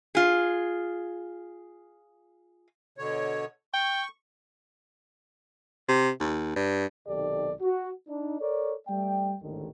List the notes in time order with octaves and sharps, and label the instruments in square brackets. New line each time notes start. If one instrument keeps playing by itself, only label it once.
[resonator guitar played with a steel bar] F4 G#4
[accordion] B2 D3 C#5
[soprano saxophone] G5 [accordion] C#6
[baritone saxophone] C3
D#2
G2
[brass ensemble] B1 C3 D#3 G4 A4 D5
F#4
D4 D#4
A4 A#4 C#5 D5
G3 A3 D5 G5
A1 D#2 G#2 D3 D#3